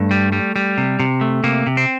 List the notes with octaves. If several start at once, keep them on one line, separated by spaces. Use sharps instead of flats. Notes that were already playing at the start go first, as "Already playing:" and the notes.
Already playing: G2 A3
G3
G3
G3
C3
C3
A3
C3 A#3
C3
C4